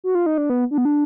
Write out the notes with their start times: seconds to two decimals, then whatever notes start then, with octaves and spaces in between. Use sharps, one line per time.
0.04 F#4
0.15 F4
0.26 D#4
0.38 D4
0.50 B3
0.71 D4
0.78 B3
0.85 D4